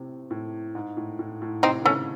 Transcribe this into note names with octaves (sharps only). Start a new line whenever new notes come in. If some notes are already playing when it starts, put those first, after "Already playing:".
Already playing: A2 C3
A2
G#2
A2
A2
A2
C3 C4 D#4
D#3
C#3 A3 C#4